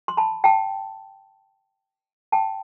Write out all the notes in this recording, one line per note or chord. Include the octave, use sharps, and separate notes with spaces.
C6
A5 B5
G5 A5
G5 A5